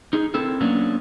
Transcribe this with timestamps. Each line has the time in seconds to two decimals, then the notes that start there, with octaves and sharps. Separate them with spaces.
0.13 D#4 G#4
0.34 C4 E4 A4 A#4
0.61 F#3 A#3 B3 C#4 D4